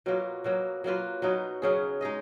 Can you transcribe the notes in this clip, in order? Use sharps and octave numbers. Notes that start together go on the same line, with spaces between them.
B2 F#3 A#3 F4
B2 F#3 A#3
F#3 A#3 F4 B4
B2 F#3 B3 D#4
C#3 F#3 C#4 G#4
G#3 D#4 G#4 D#5